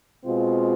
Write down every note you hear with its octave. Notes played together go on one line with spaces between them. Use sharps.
B2 G#3 C4 F4